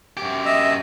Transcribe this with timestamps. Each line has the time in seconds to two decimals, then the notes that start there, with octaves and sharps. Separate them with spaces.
0.17 F#2 G4
0.45 D#5 E5